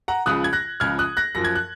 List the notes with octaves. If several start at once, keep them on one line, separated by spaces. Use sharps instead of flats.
F#5 A#5
C#2 C#3 F3 D#6 F#6
G#6
F#6 A#6
C#2 C#3 F3 F6 G#6
D#6 F#6
F#6 A#6
F#2 F3 A#6
G#6
F#6